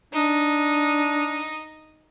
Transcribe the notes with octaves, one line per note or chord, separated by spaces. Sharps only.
D4 D#4